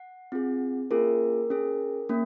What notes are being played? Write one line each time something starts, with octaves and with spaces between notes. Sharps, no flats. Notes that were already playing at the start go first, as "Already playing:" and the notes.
Already playing: F#5
C4 F4 G#4
A#3 C#4 F4 G#4 A#4
C#4 G#4
A#3 C#4